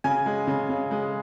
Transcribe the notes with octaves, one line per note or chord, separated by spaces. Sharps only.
C#3 G#5
G#3
C#3
C#3
G#3